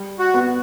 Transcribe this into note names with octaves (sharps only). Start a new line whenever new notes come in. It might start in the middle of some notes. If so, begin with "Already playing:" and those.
Already playing: G3
F#4
B3